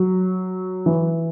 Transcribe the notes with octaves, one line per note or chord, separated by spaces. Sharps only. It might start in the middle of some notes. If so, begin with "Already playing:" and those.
Already playing: F#3
E3